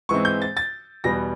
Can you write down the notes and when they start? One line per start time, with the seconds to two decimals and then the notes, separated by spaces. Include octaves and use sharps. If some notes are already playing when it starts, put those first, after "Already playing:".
0.09 G#2 E3 G#3 C4 C#6
0.25 G6
0.42 A6
0.57 A6
1.04 E2 B2 G3 B3 A#6